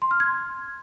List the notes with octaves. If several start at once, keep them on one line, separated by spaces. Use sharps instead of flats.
C6
F6
G#6